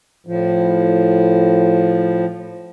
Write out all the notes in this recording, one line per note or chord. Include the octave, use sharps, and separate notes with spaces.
A2 F3